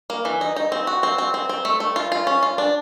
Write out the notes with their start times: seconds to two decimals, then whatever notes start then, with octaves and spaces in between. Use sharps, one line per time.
0.10 A#3
0.25 E3
0.41 D#4
0.56 D#4
0.72 C4
0.87 F#4
1.03 C4
1.18 C4
1.34 C4
1.49 C4
1.65 A3
1.80 A3
1.96 F4
2.12 F4
2.27 C#4
2.43 F4
2.58 D4